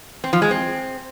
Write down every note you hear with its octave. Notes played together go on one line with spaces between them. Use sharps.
C4
F3
G#3
C4